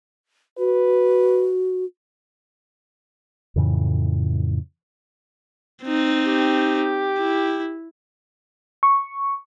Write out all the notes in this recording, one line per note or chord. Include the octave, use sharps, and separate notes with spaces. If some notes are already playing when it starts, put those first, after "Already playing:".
F#4 B4
F2 A2 C#3 E3
C4 D#4
G4
E4
C#6